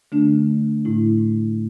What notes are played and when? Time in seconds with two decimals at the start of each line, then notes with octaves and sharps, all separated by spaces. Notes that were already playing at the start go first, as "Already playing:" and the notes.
0.12 D3 A3 D4
0.85 A2 A3 E4